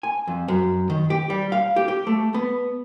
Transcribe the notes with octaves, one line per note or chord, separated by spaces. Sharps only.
G#5
F2
F#2
D#3
G4
G3
F5
G4
G4
A3
B3